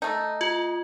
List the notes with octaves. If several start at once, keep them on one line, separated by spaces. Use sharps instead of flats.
A3 D#4
F4